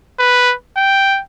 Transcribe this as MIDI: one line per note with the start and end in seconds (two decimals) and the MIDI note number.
0.19 0.54 71
0.77 1.20 79